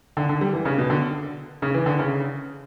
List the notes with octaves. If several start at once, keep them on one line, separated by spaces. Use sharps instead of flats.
D3
D3
G3
E3
C#3
B2
D3
C#3
E3
D3
C#3